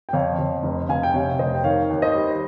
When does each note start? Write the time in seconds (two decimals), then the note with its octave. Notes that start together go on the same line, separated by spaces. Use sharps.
0.09 G5
0.13 F2 C#5 F5
0.39 F2
0.63 F1
0.89 F1 F5 G#5
1.03 G5
1.14 C3 C#5 F5
1.39 F1 C5 D#5
1.55 G5
1.64 D#3 C#5 F5
1.90 D#2
2.02 C5 D#5
2.14 G3